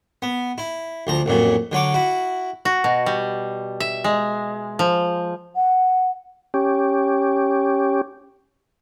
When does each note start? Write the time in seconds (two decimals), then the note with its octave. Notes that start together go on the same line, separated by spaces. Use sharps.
0.22 B3
0.58 E4
1.07 D2 F3 A#5
1.26 A1 F2 A#2 F#3
1.72 D3 F#3 C#5 D6
1.94 E4 F#4
2.65 F#4
2.84 B2
3.06 G3
3.80 E5
4.04 G#3
4.79 F3
5.55 F#5
6.54 C#4 G4